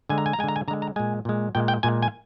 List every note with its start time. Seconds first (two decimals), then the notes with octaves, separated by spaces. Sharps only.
0.09 D3 G#3 G#5
0.18 A#5
0.26 G#5
0.33 A#5
0.39 G#3 G#5
0.43 D3
0.48 A#5
0.56 G#5
0.68 D3 A#5
0.71 G#3
0.82 A#5
0.96 A#2 G#3 G#5
1.25 A#2 G#3
1.55 A#2 G#3 G5
1.68 G5
1.83 A#2 G#3 G#5
2.02 G#5